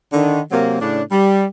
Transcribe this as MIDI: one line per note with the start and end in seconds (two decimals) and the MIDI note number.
0.13 0.40 50
0.13 0.40 51
0.52 0.77 48
0.52 0.77 54
0.52 0.77 58
0.81 1.02 45
0.81 1.02 49
0.81 1.02 62
1.12 1.44 55